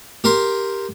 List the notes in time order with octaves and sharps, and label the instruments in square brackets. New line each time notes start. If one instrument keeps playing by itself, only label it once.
[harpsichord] G4 A#4 C6